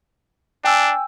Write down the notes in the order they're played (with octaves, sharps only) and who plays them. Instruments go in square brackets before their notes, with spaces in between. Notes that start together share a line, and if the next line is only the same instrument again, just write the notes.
[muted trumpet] D4 [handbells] G5 G#5 E6